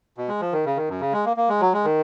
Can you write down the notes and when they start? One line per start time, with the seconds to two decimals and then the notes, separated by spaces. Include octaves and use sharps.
0.18 B2
0.28 G#3
0.41 F3
0.53 D#3
0.65 C#3
0.76 D#3
0.89 F#2
1.01 C#3
1.13 G#3
1.25 A#3
1.37 A#3
1.49 G#3
1.61 F#3
1.73 G#3
1.85 D#3